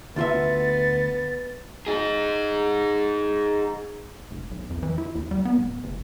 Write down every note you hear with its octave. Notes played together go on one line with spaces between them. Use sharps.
D2 B3 F4 E5 A6
D#4 G#4
F1
B1
F2
E3
E4
D#2
G3
B3
D1
F#1